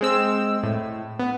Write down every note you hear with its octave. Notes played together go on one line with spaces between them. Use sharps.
G#3 C4 E6
A2
B3